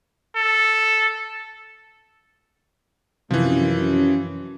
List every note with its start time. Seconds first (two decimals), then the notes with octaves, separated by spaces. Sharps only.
0.36 A4
3.31 F#2 C3 E3 F3